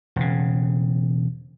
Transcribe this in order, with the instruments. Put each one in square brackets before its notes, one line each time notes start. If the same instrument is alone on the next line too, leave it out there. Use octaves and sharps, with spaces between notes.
[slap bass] E1 C#3